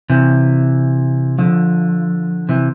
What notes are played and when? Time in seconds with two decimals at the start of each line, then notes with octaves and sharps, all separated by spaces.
0.10 C3 E3
1.38 D3 F3
2.49 C3 E3